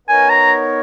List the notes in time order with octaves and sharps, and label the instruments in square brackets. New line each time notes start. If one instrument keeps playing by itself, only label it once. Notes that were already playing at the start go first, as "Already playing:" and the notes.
[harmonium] B3 D#4 A#4 C#5 [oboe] G#5
[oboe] A#5